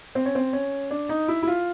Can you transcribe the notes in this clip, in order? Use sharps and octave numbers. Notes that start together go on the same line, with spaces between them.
C4
C#4
C4
C#4
D4
D#4
E4
E4
F4